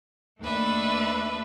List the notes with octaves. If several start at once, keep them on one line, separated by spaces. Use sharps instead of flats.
D#2 A3 D4 B4 E5